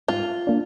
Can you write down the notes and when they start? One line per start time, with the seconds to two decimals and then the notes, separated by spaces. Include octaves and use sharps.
0.08 G#2 F4
0.47 A#3 D4